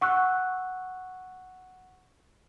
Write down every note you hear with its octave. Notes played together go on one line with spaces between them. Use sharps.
F#5 C#6 E6 F#6